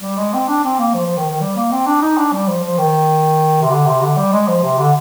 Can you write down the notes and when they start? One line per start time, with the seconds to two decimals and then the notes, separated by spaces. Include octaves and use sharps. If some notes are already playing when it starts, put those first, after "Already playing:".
0.02 G3
0.18 G#3
0.33 C4
0.48 D4
0.64 C4
0.79 A#3
0.94 F3
1.06 F3
1.17 D#3
1.29 D#3
1.41 G3
1.56 A#3
1.71 C4
1.87 D4
2.01 D#4
2.17 D4
2.32 G3
2.48 F3
2.64 F3
2.78 D#3
3.62 C3
3.71 D3
3.86 C3
4.02 D3
4.17 G3
4.32 G#3
4.48 F3
4.63 C3
4.79 D3